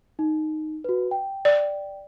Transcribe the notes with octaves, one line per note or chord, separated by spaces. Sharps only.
D#4
F#4 B4
G5
D5